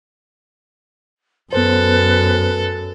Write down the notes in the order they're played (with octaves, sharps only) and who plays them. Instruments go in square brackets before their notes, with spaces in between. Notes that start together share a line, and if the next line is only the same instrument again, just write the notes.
[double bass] F#2 [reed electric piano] B3 C5 [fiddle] A4 [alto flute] B4